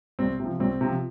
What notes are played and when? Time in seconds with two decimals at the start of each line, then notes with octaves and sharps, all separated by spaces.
0.19 C2 C4
0.40 C3 F3
0.60 C2 C4
0.81 C3 F3